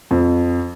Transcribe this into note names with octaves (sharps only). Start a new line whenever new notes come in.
F2